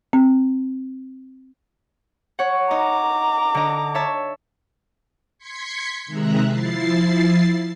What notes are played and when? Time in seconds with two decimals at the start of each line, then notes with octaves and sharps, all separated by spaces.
0.13 C4
2.39 C#5 F#5
2.71 D#4 D#5 A#5 D6
3.54 D3 D#5
3.94 C#5 E5 A5
5.38 C6 G#6 B6 C#7
6.06 C3 D#3 G#3 E5 A#5 F#6
6.47 F3 E4 A6 C7